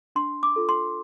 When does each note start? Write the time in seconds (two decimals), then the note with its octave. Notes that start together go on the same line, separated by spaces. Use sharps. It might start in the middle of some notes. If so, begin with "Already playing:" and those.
0.16 D4 C6
0.43 D6
0.56 F4 A4
0.69 C6